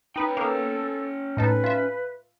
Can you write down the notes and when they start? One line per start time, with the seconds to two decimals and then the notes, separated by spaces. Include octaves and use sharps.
0.16 C#4 D#4 B4 G5
0.37 A#3 B3 A4
1.37 A2 D#4 A4 B4
1.64 F4 E5